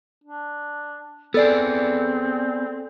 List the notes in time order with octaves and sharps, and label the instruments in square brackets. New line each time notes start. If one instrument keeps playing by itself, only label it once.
[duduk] D4
[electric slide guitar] B3 G#4 [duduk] C4 [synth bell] A4 D5